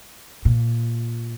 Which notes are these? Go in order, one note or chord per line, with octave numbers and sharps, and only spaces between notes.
A#2